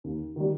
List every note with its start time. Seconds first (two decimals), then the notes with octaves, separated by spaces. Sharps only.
0.04 D#2
0.36 D#3 G3